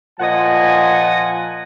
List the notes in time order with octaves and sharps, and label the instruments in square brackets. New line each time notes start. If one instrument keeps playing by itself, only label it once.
[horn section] A#2 F3 D#5 F#5 G#5